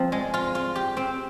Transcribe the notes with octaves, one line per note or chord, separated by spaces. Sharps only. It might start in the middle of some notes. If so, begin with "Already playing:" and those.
Already playing: F3 C4
G#3
F4
F4
G4
C4